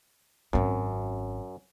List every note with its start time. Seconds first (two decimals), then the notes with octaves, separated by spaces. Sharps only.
0.53 G#1 F#2 C4